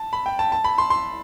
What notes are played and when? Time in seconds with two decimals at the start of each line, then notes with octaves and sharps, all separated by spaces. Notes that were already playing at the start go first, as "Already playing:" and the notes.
Already playing: A5
0.13 B5
0.26 G5
0.39 A5
0.52 A5
0.64 B5
0.78 C6
0.90 C6